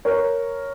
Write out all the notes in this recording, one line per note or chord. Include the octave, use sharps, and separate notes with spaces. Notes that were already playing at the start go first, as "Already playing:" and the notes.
A#4 C#5